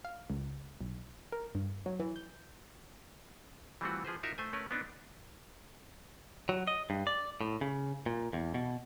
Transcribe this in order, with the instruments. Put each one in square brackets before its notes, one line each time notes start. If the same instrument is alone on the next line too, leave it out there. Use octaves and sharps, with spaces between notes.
[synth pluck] F5
C#2
B1
A#4
G2
F#3
E3
G6
[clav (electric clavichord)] E3 G3 A3 C4 F4 F#4
F3 G#4 B4 C5
D#4 F4 F#4 A#4 E5
A3 C5 G#5
A3 C#4 A#4 B4
B3 C4 D4 D#4
[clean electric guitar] F#3
D#5
G2
D5
A2
C#3
A#2
E2
B2